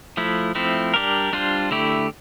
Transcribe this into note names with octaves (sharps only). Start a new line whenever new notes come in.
F3 A3 E4
F3 A3 C4 E4
G3 D4 G4 A#4
G3 D4 F4 C5
D3 A3 E4 G4